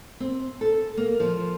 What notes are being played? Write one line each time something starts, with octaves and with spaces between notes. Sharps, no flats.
C4
A4
A#3
F3